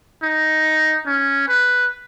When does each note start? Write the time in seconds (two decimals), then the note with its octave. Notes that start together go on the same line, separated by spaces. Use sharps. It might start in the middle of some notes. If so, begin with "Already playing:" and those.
0.22 D#4
1.06 C#4
1.48 B4